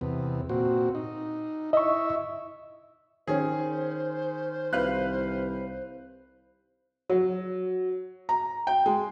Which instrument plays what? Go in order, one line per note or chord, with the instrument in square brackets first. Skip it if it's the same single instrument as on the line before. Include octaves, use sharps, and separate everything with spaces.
[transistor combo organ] E2 C3 B3
A#2 C4 F#4
D#4
[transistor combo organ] E4 E5 [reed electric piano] D#5 C#6
[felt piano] D#3 C#4 [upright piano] G#4 [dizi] C5
[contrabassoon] C2 [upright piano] B4 F5 F#6
[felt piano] F#3
A#5
G5
G#3